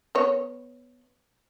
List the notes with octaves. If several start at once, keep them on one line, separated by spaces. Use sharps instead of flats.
B3 C#5